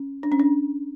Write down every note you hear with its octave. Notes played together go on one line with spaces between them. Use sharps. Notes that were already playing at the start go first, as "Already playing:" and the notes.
Already playing: C#4
D4
C#4
D4